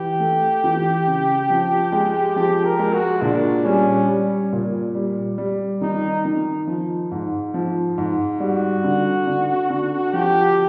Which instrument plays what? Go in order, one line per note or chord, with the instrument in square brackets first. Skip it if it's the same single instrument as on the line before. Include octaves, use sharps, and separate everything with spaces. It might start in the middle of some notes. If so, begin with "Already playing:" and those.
Already playing: [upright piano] E3 [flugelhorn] G4
[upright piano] A3
E3
C#3
F3
G#3
[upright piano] F3 [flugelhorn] G4
[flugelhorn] A#4
[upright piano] G#3
[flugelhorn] F#4
[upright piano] A#2 [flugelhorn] D4
[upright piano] G3 [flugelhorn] C#4
[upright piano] G3
A#2
G3
G3
[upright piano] D#3 [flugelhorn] D#4
[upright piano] D#3
F3
G#2
F3
G#2
[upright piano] G3 [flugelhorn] F#4
[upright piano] D3
D3
D3
[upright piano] F3 [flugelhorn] G4